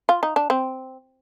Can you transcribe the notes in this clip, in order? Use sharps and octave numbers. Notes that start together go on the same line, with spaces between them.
F4
D#4
D4
C4